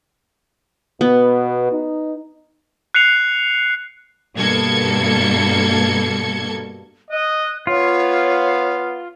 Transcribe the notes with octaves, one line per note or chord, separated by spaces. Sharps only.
B2 B3
D#4
F#6 C7 C#7 F7
G2 B2 A#3 A4 G#6 C#7
D#5 F#6
B3 F4 C#5 F5